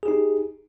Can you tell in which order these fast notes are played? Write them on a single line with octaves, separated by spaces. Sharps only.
G#4 G4 D#4